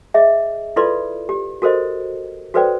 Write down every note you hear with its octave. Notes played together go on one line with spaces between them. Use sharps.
G#4 D#5 E5
E4 F4 A4 B4 D5 C6
G4
F#4 A4 A#4 C5 D#5
F#4 A4 B4 C5 D5 G5